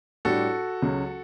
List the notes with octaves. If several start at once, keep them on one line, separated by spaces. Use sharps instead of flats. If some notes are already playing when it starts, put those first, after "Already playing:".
A2 G3 D4 F#4 G4 A4
C#2 C#3 F#3 C#4